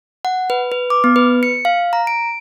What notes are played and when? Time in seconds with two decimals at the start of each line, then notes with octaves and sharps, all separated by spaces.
0.25 F#5
0.50 B4
0.72 B4
0.90 D6
1.04 B3
1.16 B4
1.43 C#7
1.65 F5
1.93 A#5
2.07 D7